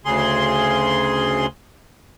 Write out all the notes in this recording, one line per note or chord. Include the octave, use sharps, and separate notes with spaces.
D2 C#3 G#4 C6